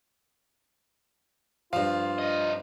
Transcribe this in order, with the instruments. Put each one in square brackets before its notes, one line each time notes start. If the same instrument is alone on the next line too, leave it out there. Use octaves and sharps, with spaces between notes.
[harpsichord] G2 F3 [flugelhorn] F4 [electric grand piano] F5
[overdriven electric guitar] D4 D#5